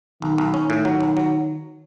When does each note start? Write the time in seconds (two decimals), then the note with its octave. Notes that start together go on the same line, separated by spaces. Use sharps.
0.22 B1 D#3
0.38 B1
0.54 C#4
0.70 A2
0.85 F#3
1.00 B1
1.17 F#3